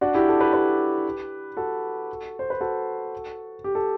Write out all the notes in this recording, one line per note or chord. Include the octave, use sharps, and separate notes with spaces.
D4 F#4
E4 G4
A4
G4 B4
G4 B4
F#4 A4
C5
B4
F#4 A4
G4
A4